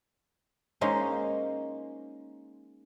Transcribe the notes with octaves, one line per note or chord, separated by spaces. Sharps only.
G#3 A#3 C#4 D#4 C5